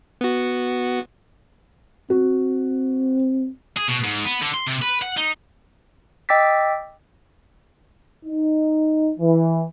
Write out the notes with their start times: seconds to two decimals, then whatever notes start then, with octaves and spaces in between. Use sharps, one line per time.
0.21 B3 F#4
2.10 C4 F#4
3.77 G#4
3.88 B2
4.04 G#2
4.25 B3
4.41 D3
4.54 C6
4.67 C3
4.82 B4
5.02 F#5
5.18 D#4
6.29 D#5 G5 D6 E6 A6 B6
8.25 D#4
9.19 E3